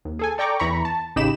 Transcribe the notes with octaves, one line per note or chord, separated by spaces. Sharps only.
D#2
G#4 A4 G#5
A4 D5 G5 A#5 C#6 D6
E2 E3 A#5 B5 C#6
A5
A1 C#3 D#4 G4 B5 E7